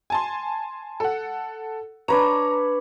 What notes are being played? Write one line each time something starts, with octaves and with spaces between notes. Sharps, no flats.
G#5 A5 C6
A4 F#5
D4 B4 C#5 A#5